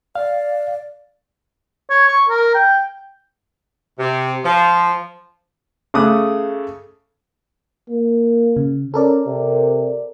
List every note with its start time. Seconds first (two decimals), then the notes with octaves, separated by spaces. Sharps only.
0.15 D5 F5
1.90 C#5
2.08 C#6
2.29 A#4
2.55 G5
3.99 C3
4.45 F3
5.94 C#3 A3 D6 D#6 F#6
7.89 A#3
8.56 C#3
8.94 C#4 A4 A#4 D5
9.26 C3